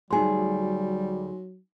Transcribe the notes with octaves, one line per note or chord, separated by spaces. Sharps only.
D2 F#3 G3 D#4 G#4 G#5 C6